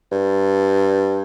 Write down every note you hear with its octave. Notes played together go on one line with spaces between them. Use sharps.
G2